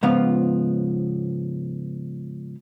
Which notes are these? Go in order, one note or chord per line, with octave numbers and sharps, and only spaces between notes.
G#2 C#3 F3 B3 F4